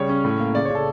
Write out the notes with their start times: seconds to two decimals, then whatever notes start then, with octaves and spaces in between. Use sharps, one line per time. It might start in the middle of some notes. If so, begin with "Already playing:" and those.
Already playing: C#3 G3 C#5
0.09 C#4
0.25 A2
0.40 A#3
0.55 C#3 D5
0.65 C#5
0.70 C#3 A4